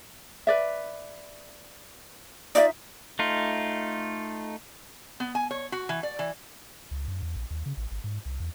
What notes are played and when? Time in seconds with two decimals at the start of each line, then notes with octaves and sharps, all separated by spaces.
0.47 B4 D5 E5
2.55 D#4 F4 D5 E5
3.19 A3 D#4 F4
5.20 B3
5.35 G#5
5.51 C#5
5.72 F#4
5.89 E3
6.03 D5
6.19 E3
6.91 C#2
7.08 F#2
7.22 E2
7.36 A#1
7.50 D#2
7.66 C#3
7.77 A1
7.91 G#1
8.04 G#2
8.25 C2
8.40 E2